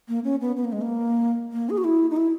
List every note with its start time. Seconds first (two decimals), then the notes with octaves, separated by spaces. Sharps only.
0.08 A#3
0.24 C#4
0.41 B3
0.56 B3
0.65 A#3
0.72 G#3
0.81 A#3
1.53 A#3
1.70 G#4
1.78 F#4
1.84 E4
2.10 D#4
2.17 E4